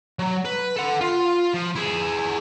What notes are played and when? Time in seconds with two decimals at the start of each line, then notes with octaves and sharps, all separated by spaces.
0.19 F#3
0.45 B4
0.77 A4 F#5
1.01 F4
1.54 F3
1.75 E4 G#4